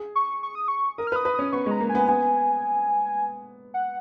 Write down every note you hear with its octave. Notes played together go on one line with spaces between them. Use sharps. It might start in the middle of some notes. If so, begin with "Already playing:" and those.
Already playing: G#4
C#6
C#6
D#6
C#6
A#4 D#6
F6
B4 D#6
B4
C#4 D#6
B3 C#6
G#3 A#5
A#3
G#5
B3
B3 G#5
F#5